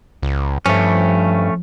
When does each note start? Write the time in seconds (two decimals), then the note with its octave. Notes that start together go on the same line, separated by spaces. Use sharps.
0.23 C#2
0.66 G2 F3 A3 C#4